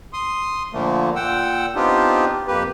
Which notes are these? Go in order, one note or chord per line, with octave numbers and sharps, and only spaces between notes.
C6 D#6
A#2 D3 F3 A3 A#3
A#2 F#5 G5 E6
B3 C4 D4 D#4 F4 G4
F2 A#3 G4 B4